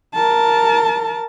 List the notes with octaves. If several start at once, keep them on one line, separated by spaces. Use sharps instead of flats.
A#4 A5